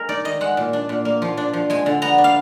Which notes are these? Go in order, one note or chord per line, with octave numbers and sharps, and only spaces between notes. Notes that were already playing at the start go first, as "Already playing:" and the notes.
Already playing: G#3 A#4
D#4 D5
D#3 D#5
G#3 F#5
A#2
D4
A#2
A#3
F3
D4
F3
G#3 G#5
D3
B3 A#5
D4
F5